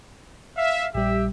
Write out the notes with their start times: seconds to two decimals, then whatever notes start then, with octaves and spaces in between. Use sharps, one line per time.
0.58 E5 F5
0.95 A#1 G3 G4 E5